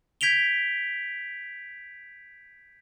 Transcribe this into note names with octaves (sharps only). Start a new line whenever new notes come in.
G6 G#6 B6 D7 F7 G7